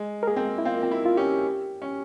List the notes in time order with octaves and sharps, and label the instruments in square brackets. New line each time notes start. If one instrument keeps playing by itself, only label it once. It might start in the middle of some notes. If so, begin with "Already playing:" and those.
Already playing: [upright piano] G#3
[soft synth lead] A#4
[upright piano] A#3 [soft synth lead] G#4
[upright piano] C4
A#3
[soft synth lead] E4
[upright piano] C4 [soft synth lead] F4
[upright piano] A#3
C4
E4
[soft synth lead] F4
[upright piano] C#4 [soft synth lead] G4
[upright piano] C#4